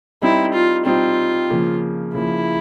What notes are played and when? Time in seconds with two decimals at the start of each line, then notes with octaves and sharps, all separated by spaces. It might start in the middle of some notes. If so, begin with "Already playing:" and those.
0.22 G3 C4 D#4 E4
0.54 F4
0.85 G3 C4 D#4 F4
1.50 C#3 F3 A#3
2.14 C#3 F3 A#3 E4